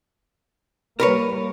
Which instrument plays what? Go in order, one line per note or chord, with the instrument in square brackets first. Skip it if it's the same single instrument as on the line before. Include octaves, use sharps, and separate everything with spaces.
[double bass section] G3 A#3 [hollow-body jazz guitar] A#4 B4 C#5